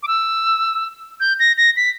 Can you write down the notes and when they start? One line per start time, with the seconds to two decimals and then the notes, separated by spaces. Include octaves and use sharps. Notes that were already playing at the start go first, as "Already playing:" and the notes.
0.03 D6
0.08 E6
1.20 G6
1.39 A#6
1.57 A#6
1.77 B6